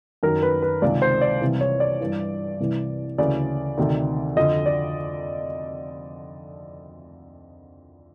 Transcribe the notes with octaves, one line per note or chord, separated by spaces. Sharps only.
F#2 D#3 A#4
B4
B4
C#2 C3 D#3 D5
C5
D5
C2 C3 E3
C#5
D5
G2 E3
C2 C3 E3
D2 C#3 E3 D5
D2 C3 D#3
F2 D3 D#5
D5